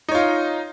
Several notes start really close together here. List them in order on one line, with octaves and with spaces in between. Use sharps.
D#4 C#5 F4